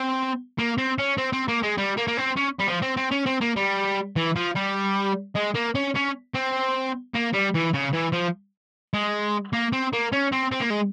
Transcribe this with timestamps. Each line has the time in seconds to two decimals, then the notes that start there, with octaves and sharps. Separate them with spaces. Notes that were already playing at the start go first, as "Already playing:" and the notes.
Already playing: C4
0.59 A#3
0.78 C4
0.98 C#4
1.18 C4
1.33 C4
1.48 A#3
1.63 G#3
1.78 G3
1.97 A#3
2.07 A#3
2.17 C4
2.36 C#4
2.59 G3
2.67 F3
2.82 C4
2.97 C4
3.12 C#4
3.26 C4
3.41 A#3
3.56 G3
4.16 E3
4.36 F3
4.55 G3
5.36 G#3
5.55 A#3
5.75 C#4
5.95 C#4
6.34 C4
7.14 A#3
7.33 G3
7.54 E3
7.74 C#3
7.93 E3
8.13 F3
8.94 G#3
9.53 A#3
9.73 C4
9.93 A#3
10.12 C#4
10.32 C4
10.52 C4
10.61 A#3
10.70 G#3